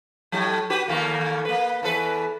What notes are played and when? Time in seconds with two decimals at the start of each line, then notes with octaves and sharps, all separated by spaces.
0.32 A2 F#3
0.70 F#4 G4 B4
0.88 D#2 A3 A#3
1.45 A#3 B4
1.83 E2 A4 B4